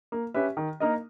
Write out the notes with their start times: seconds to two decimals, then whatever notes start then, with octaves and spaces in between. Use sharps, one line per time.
0.12 A#3
0.34 C#4 G4 B4 E5
0.57 D#3
0.80 A#3 D#4 A#4 D#5